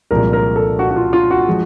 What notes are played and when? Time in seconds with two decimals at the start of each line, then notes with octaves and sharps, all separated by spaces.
0.11 C2 A#2 F3 G#3 A#4
0.33 A#4
0.56 A4
0.79 F#4
0.91 F#4
0.96 F4
1.13 F4
1.31 F#4
1.47 F3 G#3